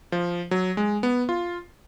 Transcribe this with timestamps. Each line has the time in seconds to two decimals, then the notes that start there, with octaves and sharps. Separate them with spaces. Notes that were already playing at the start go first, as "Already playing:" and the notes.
0.12 F3
0.51 F#3
0.77 G#3
1.03 B3
1.29 F4